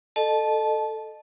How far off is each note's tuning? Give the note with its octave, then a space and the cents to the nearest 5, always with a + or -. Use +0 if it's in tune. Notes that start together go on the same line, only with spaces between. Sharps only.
A4 +0 D#5 -30 A5 -20